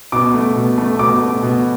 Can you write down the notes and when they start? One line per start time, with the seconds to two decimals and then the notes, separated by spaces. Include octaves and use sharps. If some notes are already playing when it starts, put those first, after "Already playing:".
0.12 B2 D6
0.34 A3
0.56 B2
0.78 A3
0.99 B2 D6
1.21 A3
1.43 B2